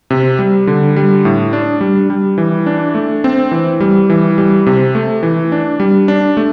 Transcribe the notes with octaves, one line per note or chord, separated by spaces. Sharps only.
C3
G3
D3
G3
A2
D4
G3
G3
E3
D4
A3
C4
E3
G3
E3
G3
C3
A3
E3
D4
G3
D4
A3